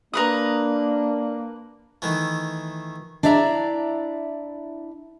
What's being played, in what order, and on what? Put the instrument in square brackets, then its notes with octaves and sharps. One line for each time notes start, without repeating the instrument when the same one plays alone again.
[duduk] A#3 [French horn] D4 [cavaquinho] A#4 B4 D#6
[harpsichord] D#3 E3 A3
[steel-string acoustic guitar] D4 E4 D5 E5 A#5